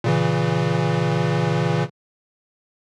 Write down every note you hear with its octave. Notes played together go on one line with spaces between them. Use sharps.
A#2 C#3 E3